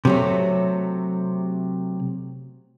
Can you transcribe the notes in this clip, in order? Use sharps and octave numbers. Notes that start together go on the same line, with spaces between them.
C3 F#3 A3